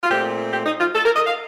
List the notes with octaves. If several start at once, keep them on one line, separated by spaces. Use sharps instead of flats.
F4
A#2 A3 C4 G4
G4
D#4
F4
A4
A#4
D#5
F5